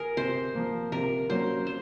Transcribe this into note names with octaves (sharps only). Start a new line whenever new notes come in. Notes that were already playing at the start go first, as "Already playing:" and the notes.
Already playing: G#4 A#4
C3 C5
F3 A#3
C3 A#4
F#3 A#3 C#4 C5
C5